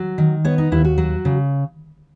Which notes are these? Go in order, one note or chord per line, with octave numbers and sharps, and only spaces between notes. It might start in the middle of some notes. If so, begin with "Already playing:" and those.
Already playing: F#3
D#3
B3 C#5
D#4
D#2 E4
F#4
F#3
C#3